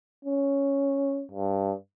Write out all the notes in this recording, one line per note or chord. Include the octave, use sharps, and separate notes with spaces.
C#4
G2